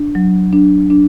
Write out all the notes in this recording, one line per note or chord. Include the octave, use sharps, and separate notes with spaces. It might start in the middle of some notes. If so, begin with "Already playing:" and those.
Already playing: D4
F#3
D4
D4